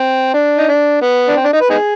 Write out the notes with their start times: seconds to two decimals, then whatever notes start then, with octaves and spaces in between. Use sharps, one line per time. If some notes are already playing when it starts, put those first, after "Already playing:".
Already playing: C4
0.34 D4
0.58 D#4
0.68 D4
1.02 B3
1.28 D4
1.36 C4
1.44 D4
1.53 D#4
1.61 B4
1.70 B3 D#4 G#4